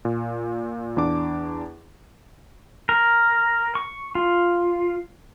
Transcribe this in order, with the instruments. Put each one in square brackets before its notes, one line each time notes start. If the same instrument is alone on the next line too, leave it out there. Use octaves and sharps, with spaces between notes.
[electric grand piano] A#2
E2 D4 D6
[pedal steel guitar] A#4
C#6
F4